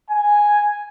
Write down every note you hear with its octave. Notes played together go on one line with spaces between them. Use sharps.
G#5